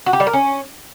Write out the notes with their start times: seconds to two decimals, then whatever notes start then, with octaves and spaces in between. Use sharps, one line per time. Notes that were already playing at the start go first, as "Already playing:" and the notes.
0.06 F#4
0.13 G4
0.20 G3
0.27 A#4
0.33 C#4